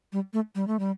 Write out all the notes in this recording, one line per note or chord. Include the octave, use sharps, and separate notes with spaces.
G3
A3
G3
A3
G3